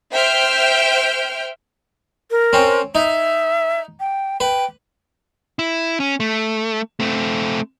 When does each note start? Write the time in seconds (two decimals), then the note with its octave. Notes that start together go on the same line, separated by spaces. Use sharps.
0.13 C5 E5 G5 F6 G6 D7
2.31 A#4
2.53 C4 C#4
2.95 D#4 E5
4.00 G5
4.40 B4 G5
5.59 E4
6.00 C#4
6.20 A3
7.00 A3 C4